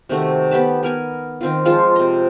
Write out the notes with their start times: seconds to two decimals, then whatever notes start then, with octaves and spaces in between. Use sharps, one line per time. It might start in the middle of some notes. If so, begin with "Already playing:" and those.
0.09 C3 D#3 A3 F#4
0.51 B3 G4 B4 A5
0.83 B3 A#4 G#5
1.41 D#3 C4 F4
1.65 F3 G#3 F4 A5
1.96 C3 D#5